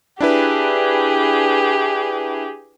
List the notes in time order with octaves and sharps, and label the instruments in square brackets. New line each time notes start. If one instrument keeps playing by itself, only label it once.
[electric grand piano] D4 E4 B4 [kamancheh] G4 G#4